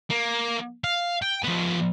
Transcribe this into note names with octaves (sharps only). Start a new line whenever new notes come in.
A#3
F5
G5
F3 B3